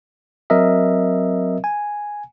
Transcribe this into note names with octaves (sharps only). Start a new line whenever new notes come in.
F#3 C4 A#4 D#5 E5
G#5